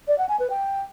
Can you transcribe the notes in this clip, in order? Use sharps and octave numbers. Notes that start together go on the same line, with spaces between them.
D5
F#5
G#5
B4
G5